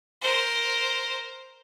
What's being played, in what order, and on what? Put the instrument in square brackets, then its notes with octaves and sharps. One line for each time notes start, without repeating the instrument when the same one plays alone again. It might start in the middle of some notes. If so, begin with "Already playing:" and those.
[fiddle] A#4 C5